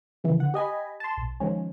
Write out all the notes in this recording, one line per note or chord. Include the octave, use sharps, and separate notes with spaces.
C#3 E3 F3
D3 F#5
G4 D#5 G#5 B5
A5 C6
B1
D#3 F3 G#3 C#4